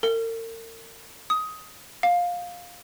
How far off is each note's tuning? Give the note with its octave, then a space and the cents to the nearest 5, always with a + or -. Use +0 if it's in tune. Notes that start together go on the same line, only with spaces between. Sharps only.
A#4 -40
D#6 +15
F5 +15